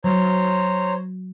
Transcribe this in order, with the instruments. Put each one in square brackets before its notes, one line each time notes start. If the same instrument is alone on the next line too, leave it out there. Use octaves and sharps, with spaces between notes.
[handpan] F#3 [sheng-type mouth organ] C5 C#5 A#5